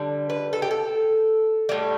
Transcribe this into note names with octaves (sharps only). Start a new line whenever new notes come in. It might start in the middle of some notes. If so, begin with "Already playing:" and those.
Already playing: D3 G3
B4
A4
G4
A4
A2 G3